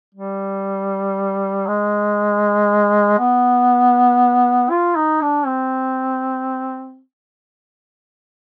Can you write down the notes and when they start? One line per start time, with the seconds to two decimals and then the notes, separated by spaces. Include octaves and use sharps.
0.14 G3
1.67 G#3
3.19 B3
4.70 F4
4.96 D#4
5.21 D4
5.46 C4